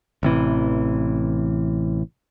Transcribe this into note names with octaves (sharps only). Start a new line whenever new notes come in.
A1 C3 E3